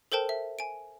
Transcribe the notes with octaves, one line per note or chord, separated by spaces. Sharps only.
A4 A#4 C5 G5 A5
E5
G#5 D7